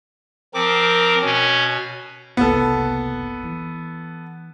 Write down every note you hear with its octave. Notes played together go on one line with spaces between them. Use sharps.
F3 C4 A#4 D6
B2 C#4
F#1 C2 B3 A4
E3